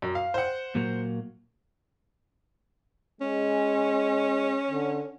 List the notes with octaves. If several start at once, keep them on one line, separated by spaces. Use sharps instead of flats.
F#2
F5
C5 F#5
A#2 F#3 A#3
G#3 C#4
D3